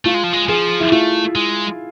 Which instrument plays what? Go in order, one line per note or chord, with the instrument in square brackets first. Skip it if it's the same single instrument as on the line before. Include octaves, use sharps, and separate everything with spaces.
[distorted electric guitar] A3 [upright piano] F4
[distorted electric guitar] G#3
F3
G#3
[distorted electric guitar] F3 [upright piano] G#4
[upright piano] E4
[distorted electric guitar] A3 [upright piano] F4
[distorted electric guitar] G#3